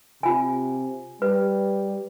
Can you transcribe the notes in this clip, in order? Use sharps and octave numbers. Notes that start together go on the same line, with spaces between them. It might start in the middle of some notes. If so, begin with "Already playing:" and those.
C3 F4 G#5
G3 B4